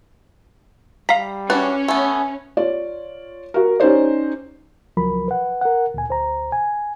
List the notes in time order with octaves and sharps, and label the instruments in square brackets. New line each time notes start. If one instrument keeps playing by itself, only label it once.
[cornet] G3 [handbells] F5 B6 [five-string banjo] A#5
[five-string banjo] E3 D4 F#4 [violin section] C#4 [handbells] B4
[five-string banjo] A3 B3 [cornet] G#5
[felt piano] F4 C#5 D5
F#4 A#4
C#4 D#4 G4 C5 D5
[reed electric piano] C#2 F3 F#3 A#4 B5
B4 F#5
A#4 F#5
D2 A#2 G#5
D2 C5 A#5
G#5